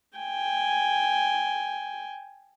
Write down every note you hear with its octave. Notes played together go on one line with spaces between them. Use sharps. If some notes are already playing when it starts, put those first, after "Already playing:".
G5 G#5